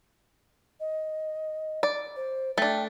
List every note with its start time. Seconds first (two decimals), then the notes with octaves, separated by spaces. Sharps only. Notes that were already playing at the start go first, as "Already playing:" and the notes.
0.80 D#5
1.83 D5
2.16 C5
2.58 A3 D4 G5